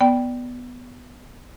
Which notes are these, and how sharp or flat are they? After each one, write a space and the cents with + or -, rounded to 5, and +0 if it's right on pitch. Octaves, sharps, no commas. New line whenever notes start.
B3 +0 D5 -5 G5 +0